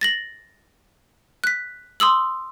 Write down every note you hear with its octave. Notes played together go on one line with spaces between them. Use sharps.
A6 A#6 F#7
F#6 B6
C6 D#6 E6 F#7